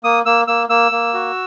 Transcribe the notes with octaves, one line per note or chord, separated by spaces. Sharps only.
A#3 D#6
A#3 E6
A#3 E6
A#3 E6
A#3
F#4